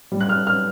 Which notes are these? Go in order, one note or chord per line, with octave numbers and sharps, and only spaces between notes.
G3
F#6
F6
F6